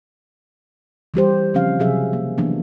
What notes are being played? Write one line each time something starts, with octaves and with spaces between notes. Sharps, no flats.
E3 G3 G4 C5
C#3 F3 C4 C#4 F5
C3 F#3 G#4 E5 F5
A#3
E3 F#3 A#3 B3 D4